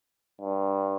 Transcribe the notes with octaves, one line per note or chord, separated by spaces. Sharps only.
G2